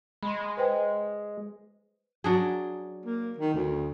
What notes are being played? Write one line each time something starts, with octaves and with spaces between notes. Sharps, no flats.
G#3 B5 C6
B4 C5 G5
F#3 D4 G#4
A#3
D#3
D2